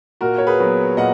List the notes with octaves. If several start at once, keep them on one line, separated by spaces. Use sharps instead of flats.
A#2 F#4 A#4
C#5
G#4 B4
F#3 B3
A#2 D#5 F#5